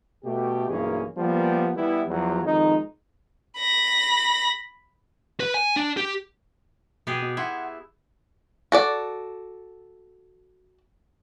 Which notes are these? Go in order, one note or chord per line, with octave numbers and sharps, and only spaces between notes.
B2 A3 G4
B1 G2 E3 A#3 C#4 G#4
F3 G3 A#3 B3
E3 G3 B3 E4
E2 F3 F#3
F2 D#3 G#3 D#4
B5 A#6
B4
G#5
D4
G4
B2 B3 G4 G#4
B2
E4 F#5 C6 G#6
F#4 A4 D5